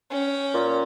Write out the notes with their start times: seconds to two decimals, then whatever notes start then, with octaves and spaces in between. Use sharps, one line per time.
0.11 C#4 G5
0.54 A#2